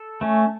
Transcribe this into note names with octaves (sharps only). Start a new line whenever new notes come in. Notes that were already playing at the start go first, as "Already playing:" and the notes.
Already playing: A4
A3 C#4